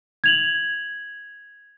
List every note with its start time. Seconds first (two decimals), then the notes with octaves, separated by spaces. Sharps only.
0.24 G#6 F7 F#7